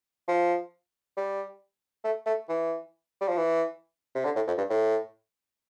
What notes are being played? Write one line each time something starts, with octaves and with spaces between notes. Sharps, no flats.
F3
G3
A3
A3
E3
G3
F3
E3
C3
D3
A2
F2
G2
A2